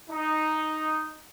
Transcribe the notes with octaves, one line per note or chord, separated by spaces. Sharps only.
D#4